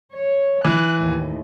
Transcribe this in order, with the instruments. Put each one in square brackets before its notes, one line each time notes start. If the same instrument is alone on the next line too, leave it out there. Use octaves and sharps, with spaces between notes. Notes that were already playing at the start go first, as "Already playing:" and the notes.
[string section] C#5
[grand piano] E3 [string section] F#6
[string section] D#2 A2